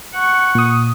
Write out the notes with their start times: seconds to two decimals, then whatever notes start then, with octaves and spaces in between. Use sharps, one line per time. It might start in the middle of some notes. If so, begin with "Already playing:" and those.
0.15 F#5 C#6
0.55 A#2 D#6